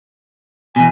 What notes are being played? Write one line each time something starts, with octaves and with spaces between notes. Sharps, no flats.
E2 B2 G#5